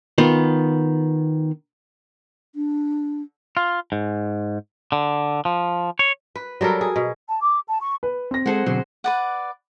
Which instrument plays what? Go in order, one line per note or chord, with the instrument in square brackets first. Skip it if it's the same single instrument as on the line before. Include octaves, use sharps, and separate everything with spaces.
[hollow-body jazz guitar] D#3 B3 F4
[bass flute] D4
[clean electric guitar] F4
G#2
D3
F3
C#5
[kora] B4
F#3 G3 A4 A#4
G#4
B2
[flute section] A5
D6
A5
C#6
[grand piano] B4
C4 A#6
[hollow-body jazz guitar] G#3 A4 [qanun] G#4 C5 F#5
[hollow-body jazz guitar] B2 D3 F#3 [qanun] C5
[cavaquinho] B4 D5 F#5